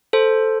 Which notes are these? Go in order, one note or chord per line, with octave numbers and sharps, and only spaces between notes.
A4 C5